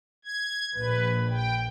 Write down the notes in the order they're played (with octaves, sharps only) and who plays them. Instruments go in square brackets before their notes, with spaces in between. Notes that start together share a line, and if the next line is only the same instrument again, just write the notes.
[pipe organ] G#6
[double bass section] A#1 [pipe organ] B4
[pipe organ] G5